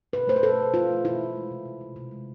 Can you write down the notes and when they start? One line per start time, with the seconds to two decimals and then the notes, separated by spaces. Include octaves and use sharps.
0.13 B2 B4
0.27 A3 C5
0.36 B4
0.43 B2 A4
0.58 B2
0.74 A3 F4
0.89 A3
1.05 B2 E4
1.20 A3
1.36 G#3
1.51 C3
1.65 C3
1.81 C3
1.96 C3
2.11 G#3